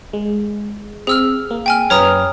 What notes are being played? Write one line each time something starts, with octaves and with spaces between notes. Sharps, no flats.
G#3
C4 G#4 E6 F6
A#3
G5 G#5 F6
F#2 B4 C#5 A#5 D#6 F6